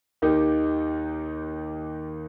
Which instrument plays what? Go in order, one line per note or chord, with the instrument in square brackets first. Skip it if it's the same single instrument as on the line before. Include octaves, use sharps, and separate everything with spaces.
[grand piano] D#2 D#3 A#3 D#4 G4